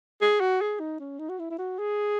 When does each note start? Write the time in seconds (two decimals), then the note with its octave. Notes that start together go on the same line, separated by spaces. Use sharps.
0.22 G#4
0.40 F#4
0.61 G#4
0.80 D#4
1.00 C#4
1.19 D#4
1.29 F#4
1.39 E4
1.51 E4
1.58 F#4
1.79 G#4